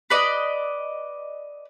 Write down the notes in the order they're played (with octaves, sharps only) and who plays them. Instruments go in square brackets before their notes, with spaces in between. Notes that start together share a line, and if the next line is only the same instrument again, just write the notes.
[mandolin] B4 D5 D#5